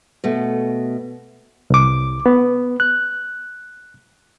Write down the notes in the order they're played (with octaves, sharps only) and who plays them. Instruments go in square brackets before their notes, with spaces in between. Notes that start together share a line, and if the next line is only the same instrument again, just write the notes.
[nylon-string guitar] B2 A3
[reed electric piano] C2 D6
B3
F#6